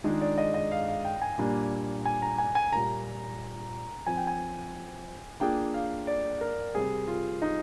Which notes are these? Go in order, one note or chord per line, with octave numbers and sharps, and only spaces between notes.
D#3 G#3 D4 D#4 F4 G#4
D5
D#5
D#5
F5
F5
G5
G#5
A#2 G3 A#3 D4
G#5
A#5
G#5
G#5
A#2 G3 A#3 F4 A#4 A#5
F3 C4 F4 G#5
G5
G#5
A#3 D4 F4 G#4 G5
F5
D5
A#4
C3 G3 C4 G#4
F4
D#4